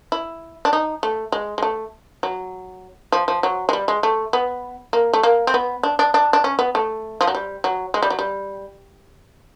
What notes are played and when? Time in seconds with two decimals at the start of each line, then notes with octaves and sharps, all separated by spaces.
0.12 E4
0.65 D4
0.73 D#4
1.03 A3
1.32 G#3
1.58 G#3
1.62 A3
2.23 F#3
3.12 F3
3.28 F3
3.43 F#3
3.69 G#3
3.73 G3
3.88 G#3
4.03 A3
4.33 B3
4.93 A#3
5.13 A3
5.23 A#3
5.47 C4
5.54 B3
5.83 D4
5.99 D4
6.14 D4
6.33 D4
6.44 C#4
6.59 B3
6.75 A3
7.21 F3
7.27 F#3
7.35 G3
7.64 F#3
7.94 G#3
8.03 G3
8.10 F#3
8.19 G3